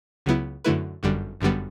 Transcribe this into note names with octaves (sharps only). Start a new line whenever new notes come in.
C#2 C#3 F#3 B3 E4
F#2 D3 A3 E4 B4
G1 F#2 D3 G3
G1 F#2 D3 G3 B3